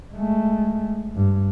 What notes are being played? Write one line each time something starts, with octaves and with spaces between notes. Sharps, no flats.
G#3 A3
G2